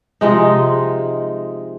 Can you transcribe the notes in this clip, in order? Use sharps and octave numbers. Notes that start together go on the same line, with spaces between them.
C3 F3 G#3 D#4